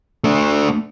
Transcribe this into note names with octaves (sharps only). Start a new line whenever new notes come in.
A3 D4